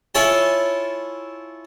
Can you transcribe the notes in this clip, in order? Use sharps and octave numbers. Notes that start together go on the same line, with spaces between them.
E4 F4 A4 C#5 G#5 A5